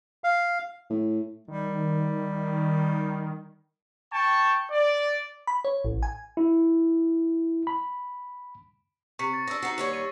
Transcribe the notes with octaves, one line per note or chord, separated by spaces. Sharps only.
F5
A2
D#3 G3
G5 A5 C#6
D5
B5
C#5
A1
G#5
E4
B5
C3 C#6 B6 C#7
A6
D4 D#5 E6 A#6
D#4 F#4 C7 C#7
D#2 G3 C#5
D#7